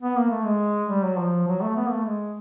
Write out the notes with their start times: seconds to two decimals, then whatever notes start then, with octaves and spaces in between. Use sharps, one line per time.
0.02 B3
0.16 A#3
0.31 A3
0.45 G#3
0.89 G3
1.04 F#3
1.18 F3
1.47 F#3
1.62 A3
1.76 B3
1.87 A#3
1.91 A3
2.05 G#3